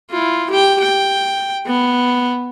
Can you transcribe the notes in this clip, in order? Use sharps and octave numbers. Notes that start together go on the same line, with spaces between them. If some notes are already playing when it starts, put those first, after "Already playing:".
E4 F4
G4 G5
G5
B3